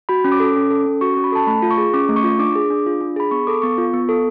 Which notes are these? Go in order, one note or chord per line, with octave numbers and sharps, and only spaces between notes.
F#4 B5
C#4
D6
A4
C#4
A4
C#4
F#4 C#6
C#4 C#6
B5
A4 A5
A3 B5
F4
C#6
G#4
C#4 D6
A3
C#6
F4
D4 D6
G#4
D4
F4
D4
G#4 B5
B3 C#6
A4 D6
B3 C#6
F4
B3
A4